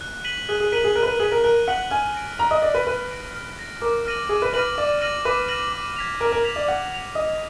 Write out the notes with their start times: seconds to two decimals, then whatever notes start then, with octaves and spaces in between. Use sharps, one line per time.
0.01 F#6
0.24 B6 D#7 F#7
0.49 G#4 F#6
0.60 G#4
0.72 A#4 B6 D#7 F#7
0.84 G#4
0.95 A#4 F#6
1.03 B4
1.08 A#4
1.20 G#4 B6 D#7 F#7
1.32 A#4
1.44 A#4 F#6
1.68 F#5 B6 D#7 F#7
1.91 G#5 F6
2.15 A#6 D7
2.39 A#5 F6
2.51 D#5
2.62 D5 A#6 D7
2.74 B4
2.87 B4 F6
3.10 A#6 D7
3.34 F6
3.59 A#6 D7
3.81 A#4 D6
4.05 F6 A#6 D#7 F#7
4.29 G#4 D6
4.42 B4
4.53 B4 F6 A#6 D#7 F#7
4.78 D5 D6
5.01 F6 A#6 D#7 F#7
5.25 B4 D6
5.48 F6 A#6 D#7 F#7
5.73 D6
5.96 G#6 B6 F7
6.20 A#4 D6
6.32 A#4
6.44 G#6 B6 F7
6.56 D5
6.68 F#5 D6
6.92 G#6 B6 F7
7.15 D#5 D6